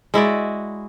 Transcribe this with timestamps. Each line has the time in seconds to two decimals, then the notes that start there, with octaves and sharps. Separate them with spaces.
0.14 G#3 E4 F#4 D5